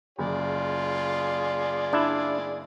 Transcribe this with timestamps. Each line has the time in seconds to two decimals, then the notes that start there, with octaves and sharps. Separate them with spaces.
0.19 F#1 F4 G#4 D5
1.93 D4 E4